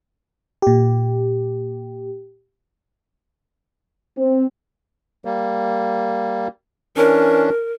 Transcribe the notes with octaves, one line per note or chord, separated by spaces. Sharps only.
A#2 G4
C4
G3 A#3
E3 C#4 D4 A#4